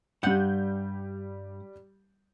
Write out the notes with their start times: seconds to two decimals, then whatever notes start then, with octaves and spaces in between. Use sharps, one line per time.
0.23 G2 G3 F#5 G6